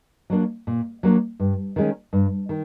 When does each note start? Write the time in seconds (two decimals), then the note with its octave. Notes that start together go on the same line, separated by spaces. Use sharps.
0.30 F#3 A#3 D4
0.67 A#2
1.03 F#3 A#3 D4
1.40 G2
1.76 D#3 G#3 C#4
2.13 G2
2.49 D#3